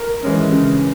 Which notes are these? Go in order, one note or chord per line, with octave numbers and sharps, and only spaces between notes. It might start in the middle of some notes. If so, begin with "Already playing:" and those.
Already playing: A#4
E3 G#3 C#4
C#3